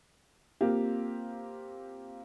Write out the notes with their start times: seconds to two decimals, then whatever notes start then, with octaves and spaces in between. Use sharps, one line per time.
0.61 A#3 C4 F4 G4